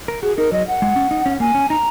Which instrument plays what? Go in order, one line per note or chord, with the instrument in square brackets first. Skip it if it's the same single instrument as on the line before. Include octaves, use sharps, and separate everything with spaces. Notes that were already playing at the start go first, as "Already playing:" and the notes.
[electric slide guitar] A#4
[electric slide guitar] F#4 [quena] G#4
[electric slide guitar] D#4 [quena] A#4
[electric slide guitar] F#3 [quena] D#5
[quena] F#5
[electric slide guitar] G#3
C#4
D#4
C#4
[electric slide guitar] A#3 [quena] G#5
[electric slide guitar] C#4
[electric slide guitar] D#4 [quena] A#5